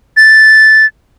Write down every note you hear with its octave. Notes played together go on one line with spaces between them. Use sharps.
A6